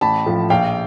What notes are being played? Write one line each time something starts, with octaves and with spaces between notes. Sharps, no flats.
A1 A5 B5
A2 F3
A#1 F5 G5